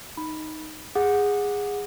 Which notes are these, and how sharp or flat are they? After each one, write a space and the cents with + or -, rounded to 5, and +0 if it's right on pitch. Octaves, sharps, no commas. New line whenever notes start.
D#4 +0 B5 +0
G#4 -15 F#5 -15 D6 +0